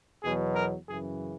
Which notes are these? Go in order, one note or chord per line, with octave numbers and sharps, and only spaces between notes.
E2 B2 F#3 G#4
A#4
F#2 C#3 E3 G#4